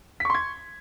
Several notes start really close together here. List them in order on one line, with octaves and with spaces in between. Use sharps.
B6 C#6 C6 G#6